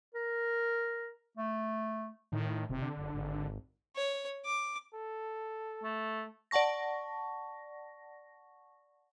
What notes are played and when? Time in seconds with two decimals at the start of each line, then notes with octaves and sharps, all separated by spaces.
0.15 A#4
1.38 A3
2.32 A2 D#3
2.69 D#1 C3
2.82 D3
2.97 F#1
3.13 G#1
3.96 C#5
4.45 D6
4.94 A4
5.83 A3
6.51 D5 F#5 A5 C#6 A#6